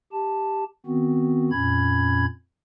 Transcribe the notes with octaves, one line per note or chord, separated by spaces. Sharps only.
G4 A5
D#3 B3 C4 F#4
F2 A#2 C#4 B5 G#6